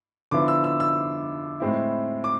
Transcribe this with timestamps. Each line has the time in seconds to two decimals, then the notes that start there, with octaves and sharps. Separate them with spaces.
0.31 D3 F3 B3 E4 D6
0.48 E6
0.64 E6
0.80 E6
1.60 A2 G#3 C4 E4
2.24 D6